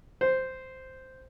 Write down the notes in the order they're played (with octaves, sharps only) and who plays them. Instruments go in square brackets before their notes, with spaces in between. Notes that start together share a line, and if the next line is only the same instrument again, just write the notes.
[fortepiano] C5